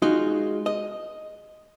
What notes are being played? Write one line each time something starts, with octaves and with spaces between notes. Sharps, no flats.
G#3 D#4 F4 F#4
D#5